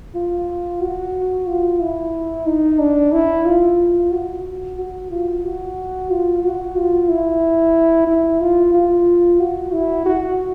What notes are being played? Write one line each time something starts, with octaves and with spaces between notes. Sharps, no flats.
F4
F#4
F4
E4
D#4
D4
E4
F4
F#4
F#4
F4
F#4
F4
F#4
F4
E4
E4
F4
F4
F#4
E4
F#4